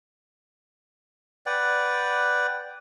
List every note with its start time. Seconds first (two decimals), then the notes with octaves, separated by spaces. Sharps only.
1.46 B4 D5 F#5 G5